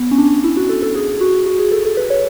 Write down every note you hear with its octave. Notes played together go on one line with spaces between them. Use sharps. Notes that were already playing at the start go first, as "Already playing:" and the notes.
Already playing: B3
C#4
D4
E4
F#4
A4
A4
G#4
F#4
F#4
G#4
A4
A4
B4
C#5